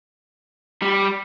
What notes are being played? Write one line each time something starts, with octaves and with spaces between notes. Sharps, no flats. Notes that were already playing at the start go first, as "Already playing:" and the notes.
G3